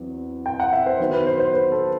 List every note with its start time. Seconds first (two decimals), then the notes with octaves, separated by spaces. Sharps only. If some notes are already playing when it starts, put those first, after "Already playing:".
Already playing: E2 F#3 C4
0.46 G5
0.60 F#5
0.73 E5
0.86 C5
0.99 D#3 F#3 B3
1.13 B4
1.27 C5
1.40 C5
1.54 B4
1.72 A4